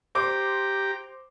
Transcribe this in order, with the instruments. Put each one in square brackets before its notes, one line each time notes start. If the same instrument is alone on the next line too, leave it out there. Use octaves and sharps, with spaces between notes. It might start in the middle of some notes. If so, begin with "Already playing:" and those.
[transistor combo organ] G4 G5 A#5 [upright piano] C5 C6 D6